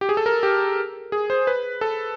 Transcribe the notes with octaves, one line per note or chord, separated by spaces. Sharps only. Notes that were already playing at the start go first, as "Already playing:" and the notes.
G4
G#4
A4
A#4
G4
G#4
C5
B4
A4